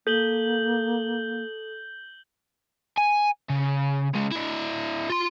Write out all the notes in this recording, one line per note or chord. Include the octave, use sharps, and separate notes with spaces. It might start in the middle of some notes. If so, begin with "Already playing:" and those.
A#3 A4 G6 F#7 G7
G#5
C#3
C#3 G#3
D4 E4
F4 C6